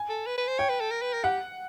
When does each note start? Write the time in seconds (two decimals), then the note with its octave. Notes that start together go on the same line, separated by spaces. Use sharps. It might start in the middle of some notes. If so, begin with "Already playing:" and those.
Already playing: G#5
0.09 A4
0.27 B4
0.38 B4
0.48 C5
0.58 C#5 G5
0.69 B4
0.80 A4
0.91 A#4
1.02 B4
1.14 A#4
1.24 G4 F#5